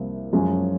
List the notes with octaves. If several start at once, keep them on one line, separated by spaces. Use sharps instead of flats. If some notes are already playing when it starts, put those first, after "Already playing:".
Already playing: C2 C3 F3 A#3
F#2 F3 G#3 C#4